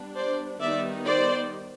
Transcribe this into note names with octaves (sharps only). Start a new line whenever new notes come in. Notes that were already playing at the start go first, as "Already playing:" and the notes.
Already playing: G3 B3 D4
C5 D5
D#3 G3 B3 D#4 D5 E5
C5 D5